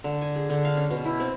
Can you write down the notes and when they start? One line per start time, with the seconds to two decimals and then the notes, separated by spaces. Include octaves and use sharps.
0.04 D3
0.22 G#5
0.36 G#4
0.50 D3
0.65 F5
0.77 C#4
0.90 B2
1.05 E4
1.20 C4